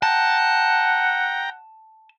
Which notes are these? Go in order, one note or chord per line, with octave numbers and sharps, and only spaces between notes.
F#5 G5 A5 A#5